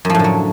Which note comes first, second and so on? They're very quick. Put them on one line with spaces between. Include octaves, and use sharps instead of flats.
F#2 F3 A2 D3 F#3